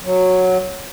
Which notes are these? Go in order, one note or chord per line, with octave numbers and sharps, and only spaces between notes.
F#3